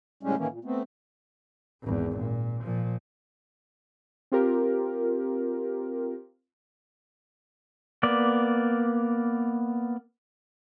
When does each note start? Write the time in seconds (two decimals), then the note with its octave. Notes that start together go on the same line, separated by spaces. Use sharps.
0.23 A2 C#3 G3 G#3 C#4
0.38 A2 D#3 E3 A#3 C#4
0.51 A#2
0.65 A3 B3 C4
1.83 G#1 E2
2.19 A#2
2.65 A#2 F3
4.32 C4 F4 G4 A#4
8.03 A#3 B3 D5